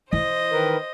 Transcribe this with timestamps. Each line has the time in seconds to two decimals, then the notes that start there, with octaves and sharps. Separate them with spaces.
0.13 E3 E4 C5 D#5
0.52 D#3 A#4 B4